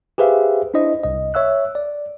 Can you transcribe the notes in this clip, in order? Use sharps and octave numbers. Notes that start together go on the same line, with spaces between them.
G4 G#4 B4 C5 E5 F5
D4 E4 C5 D#5
C2 D#5
C#5 E5 E6 F#6
D5